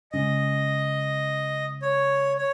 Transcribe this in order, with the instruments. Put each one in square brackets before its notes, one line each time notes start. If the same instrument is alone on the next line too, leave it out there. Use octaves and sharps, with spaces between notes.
[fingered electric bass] C#3 G#3 C#4 [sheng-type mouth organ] D#5
[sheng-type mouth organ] C#5
C#5